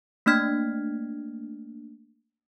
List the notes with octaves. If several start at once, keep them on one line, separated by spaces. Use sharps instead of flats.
A3 A#3 D4 F6 G#6 B6